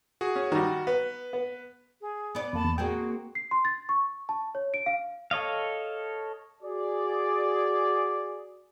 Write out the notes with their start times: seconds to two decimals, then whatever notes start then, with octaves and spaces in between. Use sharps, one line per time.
0.21 F#4 G#4
0.36 C#4
0.52 D#3 G3 F#4 A#5
0.87 B3 B4
1.33 B3
2.02 G#4
2.35 B3 D5
2.53 F2 A#3 A5 B5
2.65 E2
2.78 A#3 C4 F#4 G#4 G5
3.35 C7
3.51 C6
3.65 A6
3.89 C#6
4.29 A5
4.55 C#5
4.74 D7
4.86 F5
5.31 A4 C#5 D#5 F5
6.62 F#4 G#4 D5